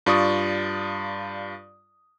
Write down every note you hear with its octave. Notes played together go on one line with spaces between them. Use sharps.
G2 F4 D5 C#6 D#6